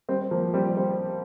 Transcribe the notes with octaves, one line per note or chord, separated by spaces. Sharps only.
G3 C4
F3 A#3
G3 C4
G3 C4